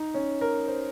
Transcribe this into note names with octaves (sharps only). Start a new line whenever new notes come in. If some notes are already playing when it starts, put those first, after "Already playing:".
Already playing: D#4
C#4
A#4
C5